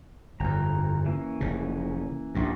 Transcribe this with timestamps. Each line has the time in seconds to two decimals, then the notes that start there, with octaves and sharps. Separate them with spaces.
0.40 G1 F2 A#5
1.06 E3 A#3 C#4
1.41 F1 C#3
2.35 A#1 G2